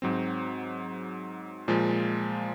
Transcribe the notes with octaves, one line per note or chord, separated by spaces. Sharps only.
G#2 F#3 C4
A#2 F3 G#3